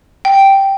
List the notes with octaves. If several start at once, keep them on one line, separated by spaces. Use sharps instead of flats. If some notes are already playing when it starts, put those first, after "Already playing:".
G5